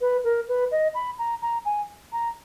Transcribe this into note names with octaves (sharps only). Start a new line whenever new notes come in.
B4
A#4
B4
D#5
B5
A#5
A#5
G#5
A#5